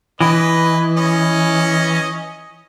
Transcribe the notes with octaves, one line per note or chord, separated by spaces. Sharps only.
E3 B4 D#5
C#4 D#5